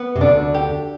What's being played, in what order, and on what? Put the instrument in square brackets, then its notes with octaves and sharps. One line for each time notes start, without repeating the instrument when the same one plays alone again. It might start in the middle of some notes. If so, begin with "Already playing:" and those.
Already playing: [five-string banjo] B3
[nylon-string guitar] C3
[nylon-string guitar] D2 D3 [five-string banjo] D4
[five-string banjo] G4